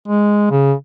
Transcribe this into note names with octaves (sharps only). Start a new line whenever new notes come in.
G#3
C#3